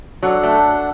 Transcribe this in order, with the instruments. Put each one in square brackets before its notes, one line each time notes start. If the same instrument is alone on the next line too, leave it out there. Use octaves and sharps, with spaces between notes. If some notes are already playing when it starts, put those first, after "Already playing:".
[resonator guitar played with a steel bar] F#3 [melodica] D4 A4 F#5
[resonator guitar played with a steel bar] A3